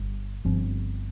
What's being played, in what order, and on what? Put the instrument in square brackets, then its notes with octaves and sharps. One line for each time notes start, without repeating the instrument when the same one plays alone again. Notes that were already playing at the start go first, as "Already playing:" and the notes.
Already playing: [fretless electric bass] G1 G2
G1 G2 F3 C4